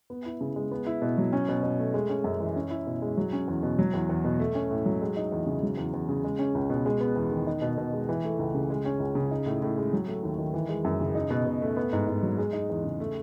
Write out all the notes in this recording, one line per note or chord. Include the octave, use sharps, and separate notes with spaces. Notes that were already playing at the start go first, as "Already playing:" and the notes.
B3
E4
C#3
G#3
B3
E4
B2
F#3
C#4
B2
B2
A3
G#3
C#4
F#2
E3
C#4
E4
B2
G#3
F#3
C#4
E2
B2
F#3
E2
E2
B2
A3
C#4
A2
F#3
G#3
D#4
E2
C#3
F#3
E2
E2
C#3
G#3
C#4
C#2
B2
G#3
B3
E2
D#3
D#4
B2
B2
G#3
E3
A3
C#2
C#3
G#3
C#4
C#2
C#3
D#4
A2
A2
G#3
F#3
A3
D#2
D#3
E3
G#3
F#2
C#3
D#4
B2
B2
A3
B3
G#2
G#2
F#3
G#3
D#4
E2
C#3
A3